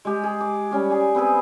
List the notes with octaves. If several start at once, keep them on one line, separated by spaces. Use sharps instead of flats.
G#3 G4
G#4
D6
G3 C#4 G4
G#4 D5 G#5
B3 C4 G#4 B4